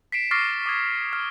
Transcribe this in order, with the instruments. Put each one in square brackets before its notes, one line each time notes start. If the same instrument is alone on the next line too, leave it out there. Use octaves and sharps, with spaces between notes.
[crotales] B6 C7 D7 E7
C#6 D6 F6 A6 A#6 C7
D6 D#6 G#6
F6